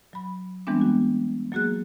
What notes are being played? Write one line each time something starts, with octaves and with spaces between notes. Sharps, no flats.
F#3 B5
E3 G3 G#3 B3 C4 D4
F#4
F#3 A#3 F#4 G#4 F#6